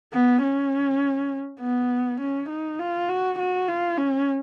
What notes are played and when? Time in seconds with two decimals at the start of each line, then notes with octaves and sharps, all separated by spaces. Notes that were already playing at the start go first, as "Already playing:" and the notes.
0.13 B3
0.43 C#4
1.61 B3
2.20 C#4
2.49 D#4
2.79 F4
3.09 F#4
3.39 F#4
3.68 F4
3.98 C#4